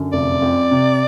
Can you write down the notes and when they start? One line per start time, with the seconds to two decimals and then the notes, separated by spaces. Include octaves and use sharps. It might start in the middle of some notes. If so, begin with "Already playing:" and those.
Already playing: F#2 D3
0.13 F1 D5
0.42 F2
0.71 C3